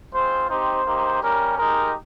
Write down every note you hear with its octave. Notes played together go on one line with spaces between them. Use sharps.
G#3 C4 F4 C5
C4 D#4 G4 C5
A#3 D#4 G4
G3 C#4 G4 A#4
G#3 D#4 G4 A#4